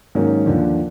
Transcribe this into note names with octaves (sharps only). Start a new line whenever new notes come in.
G#2 D#3 F#3 A#3 C#4
D#2 D3 F3